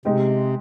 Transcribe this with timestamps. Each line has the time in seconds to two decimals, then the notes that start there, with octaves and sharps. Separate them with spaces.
0.05 C3 G#3 D#4 G4